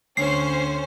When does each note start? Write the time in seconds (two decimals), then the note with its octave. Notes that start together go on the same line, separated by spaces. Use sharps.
0.17 D2 C#4 C5 C7